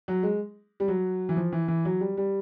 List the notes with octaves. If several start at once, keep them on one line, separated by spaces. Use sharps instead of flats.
F#3
G#3
G3
F#3
E3
F3
E3
E3
F#3
G3
G3